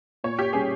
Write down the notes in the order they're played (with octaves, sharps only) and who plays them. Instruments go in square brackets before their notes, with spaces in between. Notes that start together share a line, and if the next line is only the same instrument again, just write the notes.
[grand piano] A#2 [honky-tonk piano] C#5
[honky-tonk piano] G4
[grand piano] G3 C#4 [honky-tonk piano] G#4